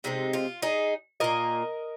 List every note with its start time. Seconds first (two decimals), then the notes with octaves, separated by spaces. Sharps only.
0.04 C3 G#3 C4 D#4
0.33 F4
0.62 D#4 G#4
1.20 A#2 A#3 A#4 D#5